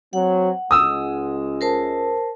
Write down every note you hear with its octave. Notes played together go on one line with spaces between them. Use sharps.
F#3 C4 F#5
C#2 G#3 D#6 E6
A#4 C5 A5